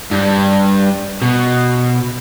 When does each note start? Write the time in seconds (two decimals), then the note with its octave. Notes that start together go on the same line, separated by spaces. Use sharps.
0.12 G2
1.22 B2